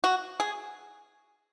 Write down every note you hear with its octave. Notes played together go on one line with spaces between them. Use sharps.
F#4
G#4